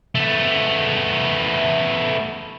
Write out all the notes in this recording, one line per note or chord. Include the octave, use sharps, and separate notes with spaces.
A3 B3